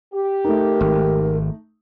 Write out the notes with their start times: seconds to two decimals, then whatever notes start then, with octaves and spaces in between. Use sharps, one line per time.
0.14 G4
0.45 A3 D#4 A#4
0.81 G#1